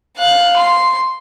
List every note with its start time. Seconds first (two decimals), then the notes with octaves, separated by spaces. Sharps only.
0.17 F5 F#6
0.56 C6